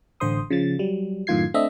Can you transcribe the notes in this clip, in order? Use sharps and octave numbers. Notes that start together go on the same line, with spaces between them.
A1 D3 C5 C6 D#6
C#3 F3 A6
F#3 G3
F#2 A2 D#3 F4 G#6 C7
A3 C4 D4 D#5 E5